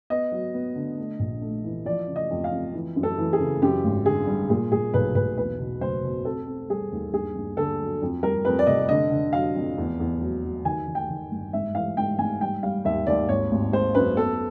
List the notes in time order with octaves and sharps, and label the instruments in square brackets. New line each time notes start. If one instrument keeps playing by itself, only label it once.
[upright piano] B3 D#5
F#3
B3
D3
A3
A#1
A3
E3
F3 D5
C#3
D#5
F2
F5
F2
E3
F#2
A4
E3
G#4
C#3
F#2 G4
G#1
D3 G#4
G3
A#2 G#4
A#2 G#4
B1 B4
B1 B4
E2 B4
B2
F#1 C5
B2
C4 A4
C4
G3 G#4
D#2
G2 G#4
G2
D3 A4
F#3
F2
G3 A#4
F2 B4
D5
F1 D#5
D3 D#5
D3
F#3 F5
F2
E2
E2
F#3
F#3
D#3 G#5
D#3
G5
D#3
G1
G#2 E5
E3 F5
G#2 G5
G#2 G#5
G3 G5
G3 F5
D#2 E5
D#2 D5
G#1 C#5
G#1
G#3 C5
F#2 B4
B3 A4